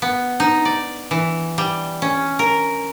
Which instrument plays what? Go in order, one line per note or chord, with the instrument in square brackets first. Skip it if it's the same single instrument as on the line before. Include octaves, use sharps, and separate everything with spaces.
[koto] B3
D#4
D5
E3
G3
C#4
A#4